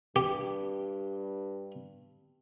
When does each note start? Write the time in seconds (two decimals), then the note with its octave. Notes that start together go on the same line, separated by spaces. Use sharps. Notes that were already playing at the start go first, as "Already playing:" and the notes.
0.16 G2 G4